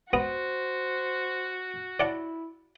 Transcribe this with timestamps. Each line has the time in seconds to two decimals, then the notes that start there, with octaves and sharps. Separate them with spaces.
0.13 B3 F#4 C5 A#5 D#6
2.00 E4 D5 F#5 A5